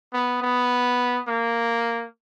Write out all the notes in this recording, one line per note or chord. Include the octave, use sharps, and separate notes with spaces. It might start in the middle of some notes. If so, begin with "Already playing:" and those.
B3
B3
A#3